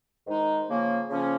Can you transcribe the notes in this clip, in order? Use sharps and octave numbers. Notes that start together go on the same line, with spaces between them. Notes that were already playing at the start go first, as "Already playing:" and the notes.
G#2 D#3 G#3 D#4
C#3 F3 A#3 C#4
C#3 F3 A#3 C#4